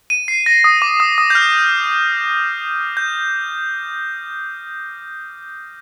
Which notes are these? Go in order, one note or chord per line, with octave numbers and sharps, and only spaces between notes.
D#7
C7
A#6
D#6
D6
D#6
D#6
G6
F6
G6